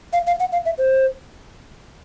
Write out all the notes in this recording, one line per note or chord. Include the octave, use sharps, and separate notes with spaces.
F5
F5
F#5
F5
E5
C5